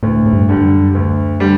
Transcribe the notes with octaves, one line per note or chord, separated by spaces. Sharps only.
D2 A2
A2
G2
D3 G3
G2
F#2
D2
D3 G3